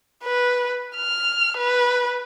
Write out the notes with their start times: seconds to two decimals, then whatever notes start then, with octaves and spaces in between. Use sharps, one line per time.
0.24 B4
0.96 F6
1.57 B4